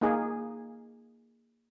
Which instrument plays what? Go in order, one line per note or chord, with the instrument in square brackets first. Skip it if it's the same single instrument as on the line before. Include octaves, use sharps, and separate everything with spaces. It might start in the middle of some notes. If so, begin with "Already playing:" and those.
[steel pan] A#3 D#4 G#4